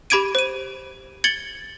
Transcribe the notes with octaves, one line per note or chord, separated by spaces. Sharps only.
G4 B5 D6 G#6 D7 D#7
C5 D#7
G#6 A6 C#7 F#7 G7